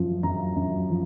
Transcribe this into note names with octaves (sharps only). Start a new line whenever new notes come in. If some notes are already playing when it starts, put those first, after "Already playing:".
Already playing: F#2 F3
F#2 A#5
F#2
F3